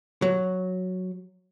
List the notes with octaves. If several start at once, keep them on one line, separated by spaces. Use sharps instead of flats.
F#3